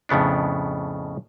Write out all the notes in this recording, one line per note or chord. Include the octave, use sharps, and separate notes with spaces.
F2 A2 C#3 B3 D4